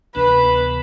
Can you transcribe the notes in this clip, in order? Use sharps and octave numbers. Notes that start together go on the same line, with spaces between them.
D2 C3 E3 B3 D4 B4